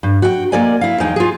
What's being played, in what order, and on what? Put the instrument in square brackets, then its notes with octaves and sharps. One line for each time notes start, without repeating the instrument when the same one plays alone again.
[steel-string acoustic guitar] G2
F#4 G5
A#3 A#4 D5 D#5 G#5
E4 F5
E2 G#3 D#4 G5
F4 G#4